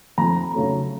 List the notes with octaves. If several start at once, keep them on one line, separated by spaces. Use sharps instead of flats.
F2 A#5
C#3 F#3 A3